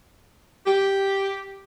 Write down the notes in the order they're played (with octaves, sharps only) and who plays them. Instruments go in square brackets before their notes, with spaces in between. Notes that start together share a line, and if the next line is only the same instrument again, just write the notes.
[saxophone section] G4